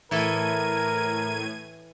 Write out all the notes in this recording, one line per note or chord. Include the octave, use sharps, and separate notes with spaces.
A2 E3 E4 A4 A#4 G#6 D#7